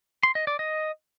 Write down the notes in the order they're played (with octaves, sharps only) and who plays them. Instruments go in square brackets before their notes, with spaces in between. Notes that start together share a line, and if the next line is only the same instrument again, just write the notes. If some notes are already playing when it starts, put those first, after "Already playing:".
[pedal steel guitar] C6
D#5
D5
D#5